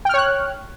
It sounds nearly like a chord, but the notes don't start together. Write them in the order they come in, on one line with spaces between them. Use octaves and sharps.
G5 F6 C#5 F#6